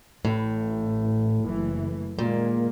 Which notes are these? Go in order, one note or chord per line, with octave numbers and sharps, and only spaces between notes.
A1 A2
F#1 E3 A3
A#2 D#3 G#3 A#3